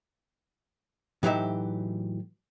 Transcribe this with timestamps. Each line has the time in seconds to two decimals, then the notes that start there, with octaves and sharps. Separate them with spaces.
1.23 A2 E3 F#3 D#4 G4 E5